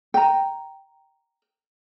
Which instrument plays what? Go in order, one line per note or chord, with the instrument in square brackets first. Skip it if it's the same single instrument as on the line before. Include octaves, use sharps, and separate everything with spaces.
[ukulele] G5 A#5